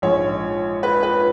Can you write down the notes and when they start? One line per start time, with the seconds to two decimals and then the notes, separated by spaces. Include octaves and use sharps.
0.02 A#1 G#2 F3 C#5
0.83 B4
1.03 B4